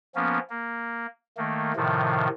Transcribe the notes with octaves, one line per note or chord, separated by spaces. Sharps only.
F3 A#3 B3 C#4
A#3
D#3 A3 A#3
A2 C3 D#3 F3